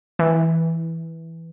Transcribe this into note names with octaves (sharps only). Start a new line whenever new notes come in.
E3